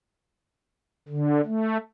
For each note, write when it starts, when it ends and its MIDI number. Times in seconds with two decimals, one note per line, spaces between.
1.08 1.41 50
1.45 1.77 57